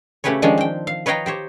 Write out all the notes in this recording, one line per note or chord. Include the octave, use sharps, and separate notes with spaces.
C#3 A3 C#4 G4 B4 C#5
D#3 F3 G#3 C#4 D4
C4 G5
F5
B4 C#5 D#5 F5 G5 A#5
G4 C5 C#5